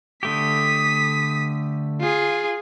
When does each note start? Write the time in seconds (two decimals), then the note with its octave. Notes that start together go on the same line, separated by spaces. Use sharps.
0.23 D3 A3 G4 D#6 B6
2.01 F4 G#4